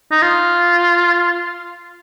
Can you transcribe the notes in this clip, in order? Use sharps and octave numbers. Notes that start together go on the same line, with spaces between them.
D#4
F4